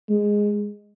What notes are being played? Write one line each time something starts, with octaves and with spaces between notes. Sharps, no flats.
G#3